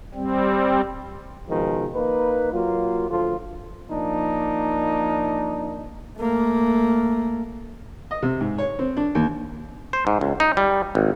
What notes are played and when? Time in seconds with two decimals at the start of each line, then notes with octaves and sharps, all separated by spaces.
0.14 G3 C4
1.48 B2 D#3 F3 G#3
1.94 A#3 D#4 B4
2.52 F#3 A#3 F4
3.09 D2 F3 F4 A4
3.90 F3 A#3 D4 D#4
6.18 A3 A#3
8.11 D#5
8.22 C3
8.41 G#2
8.58 C#5
8.79 C4
8.97 D4
9.15 D#2
9.93 C5
10.07 G#2
10.21 C#2
10.40 D#4
10.57 G3
10.95 G#1